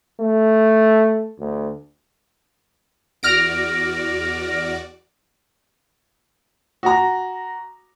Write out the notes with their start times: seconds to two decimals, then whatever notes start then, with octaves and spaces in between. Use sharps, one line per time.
0.21 A3
1.39 D2
3.23 E2 F#4 D5 F6 A#6 D7
6.83 F#4 A#5